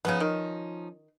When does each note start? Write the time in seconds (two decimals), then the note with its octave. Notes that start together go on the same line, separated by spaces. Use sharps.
0.05 C#3 F3 B3 C#4 D#4
0.20 D#3